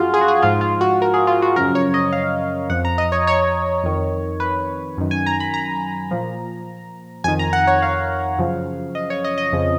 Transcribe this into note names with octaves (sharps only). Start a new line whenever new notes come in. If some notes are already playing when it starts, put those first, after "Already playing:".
Already playing: F#2 F3 F4 F#4 G#4
G#4
F#4
G#4
G#2 F3 F4
F4
F#4
A#4
G#4
F4
F#4
F#2 C#3 F3 A#4
C#5
D#5
F5
F2 F3 F#5
A#5
D#5
C#5
C#5
F2 D#3
B4
F#2 D#3
G#5
A#5
B5
A#5
A#2 F3
F2 D#3 G#5
A#5
F#5
C#5
F5
F#2 C#3 F3
D#5
C#5
D#5
D#5
F2 C#3 F3